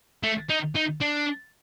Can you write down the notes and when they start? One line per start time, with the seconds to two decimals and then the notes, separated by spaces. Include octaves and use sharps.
0.23 A3
0.49 D#4
0.75 D#4
1.01 D4